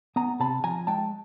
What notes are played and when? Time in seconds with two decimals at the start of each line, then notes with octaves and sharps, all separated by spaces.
0.16 B3 G#5 A#5
0.40 C3 A5 B5
0.64 F3 G#5 A#5
0.87 G#3 G5 A5